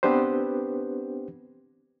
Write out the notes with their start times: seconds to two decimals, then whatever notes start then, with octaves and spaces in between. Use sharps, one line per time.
0.03 B3 C4 D4 G4 B4 C5